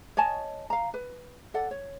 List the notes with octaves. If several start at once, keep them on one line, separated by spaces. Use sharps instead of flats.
C#5 D#5 G#5 A5
F5 A#5
B4
A4 D5 F#5
C#5